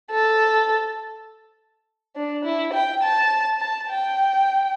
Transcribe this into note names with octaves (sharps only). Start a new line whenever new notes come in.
A4
D4
E4
G5
A5
A5
G5